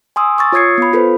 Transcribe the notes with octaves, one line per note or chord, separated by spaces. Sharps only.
G#5 C6 D#6 E6
C#6 E6 A6
F4 C#5 D#6 G#6 C7 C#7
B3 B5
F4 A4 B4 C5